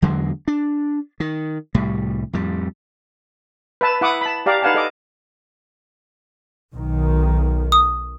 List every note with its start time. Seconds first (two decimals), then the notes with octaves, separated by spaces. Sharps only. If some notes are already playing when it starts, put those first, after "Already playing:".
0.02 E2 D3 F#3 G#3
0.48 D4
1.20 D#3
1.74 C2 A2 G3
2.33 F2 A2 G3
3.81 B4 E5 A5
4.01 E4 F#5 D6 D#6
4.21 A5 B5
4.46 G4 D5 F5 A#5 D6
4.62 D#4 B4 F5 F#5 G#5 A5
4.75 A4 D#5 D6
6.74 B1 D#3
7.72 D#6